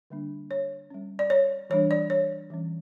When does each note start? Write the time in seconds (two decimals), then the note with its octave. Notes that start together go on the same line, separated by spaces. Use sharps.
0.10 D3 G3 A#3 D4
0.51 C#5
0.90 G3 C#4
1.19 D5
1.30 C#5
1.70 E3 G3 D4 C#5
1.91 D5
2.10 C#5
2.50 E3 G3 C#4